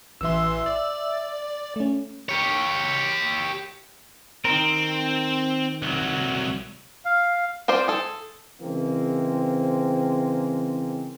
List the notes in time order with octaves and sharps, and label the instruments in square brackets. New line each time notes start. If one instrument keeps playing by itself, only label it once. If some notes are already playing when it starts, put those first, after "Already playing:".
[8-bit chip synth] A1 E3 C6 [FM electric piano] E5 E6
[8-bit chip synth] D5
[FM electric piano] A3 C#4
[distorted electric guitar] G4 C#5
[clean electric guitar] D#3 A#4 [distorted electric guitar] C4
[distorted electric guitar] C2 F#3
[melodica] F5
[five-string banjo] C4 F4 C5 D5
G#4 A4
[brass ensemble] C#3 E3 G#3 A#3 C4